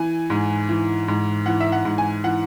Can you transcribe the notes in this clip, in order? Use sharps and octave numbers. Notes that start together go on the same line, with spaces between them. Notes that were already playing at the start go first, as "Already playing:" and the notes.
Already playing: E3 G#5
G#2
E3
G#2
E3 F#5
E5
F#5
G#2
G#5
E3 F#5